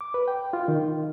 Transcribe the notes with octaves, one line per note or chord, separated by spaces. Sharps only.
D6
B4
G5
F4
D#3